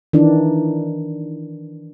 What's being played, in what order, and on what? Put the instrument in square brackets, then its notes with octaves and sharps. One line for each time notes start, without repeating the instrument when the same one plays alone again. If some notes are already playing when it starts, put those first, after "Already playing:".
[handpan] D#3 E3 D4